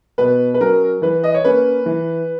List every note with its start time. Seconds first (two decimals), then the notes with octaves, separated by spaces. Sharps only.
0.18 B2 B4
0.54 B4
0.60 F#3 C#4 A#4
1.02 E3 B4
1.24 D#5
1.34 C#5
1.45 A#3 C#4 B4
1.86 E3